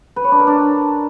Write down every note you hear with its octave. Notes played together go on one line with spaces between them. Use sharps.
B4
C#5
D4
A#4
D4